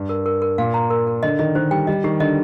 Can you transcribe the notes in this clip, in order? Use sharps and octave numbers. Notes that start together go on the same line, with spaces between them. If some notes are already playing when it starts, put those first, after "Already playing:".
Already playing: G2
A#4
A#4
A#4
A#2 F5
A#5
A#4
A#4
D3 D#5
D#3 D#5
D#3 C5
G3 G5
G3 D#5
D#3 G4
D3 D#5